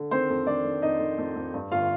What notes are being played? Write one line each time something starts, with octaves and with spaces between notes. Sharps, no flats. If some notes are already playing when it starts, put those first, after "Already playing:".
Already playing: D3
D#3 C4 C5
F2
D#3 D4 D5
D#3
F2 D#4 D#5
D#3
F2
F2
G2
G1 F4 F5